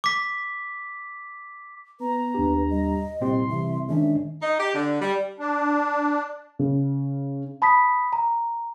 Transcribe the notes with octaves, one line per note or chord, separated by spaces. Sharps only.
D6 B6
B3 B4 A#5
D#2 D4 G4
G3 D#5
C2 A#2 C4 G4 C6
C3 E3 E5
D#3 G#3 C#4 D4 E5
D#4
G4
D3
G3
D4
C#3
A5 B5 D#6 B6
A#5